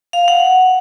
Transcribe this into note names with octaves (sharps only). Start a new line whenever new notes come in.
F5
F#5